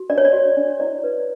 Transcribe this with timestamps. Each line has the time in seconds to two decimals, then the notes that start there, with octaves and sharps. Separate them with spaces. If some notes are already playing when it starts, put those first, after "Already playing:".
Already playing: F#4
0.10 D4 D5
0.18 C#5
0.25 D5
0.33 F#4
0.57 D4
0.80 E4 D5
1.04 B4